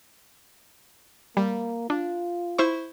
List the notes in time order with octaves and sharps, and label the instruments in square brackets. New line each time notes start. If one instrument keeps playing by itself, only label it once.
[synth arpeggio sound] G3 [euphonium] A#3
[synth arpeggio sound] D4 [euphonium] F4
[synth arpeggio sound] E4 C5 C#6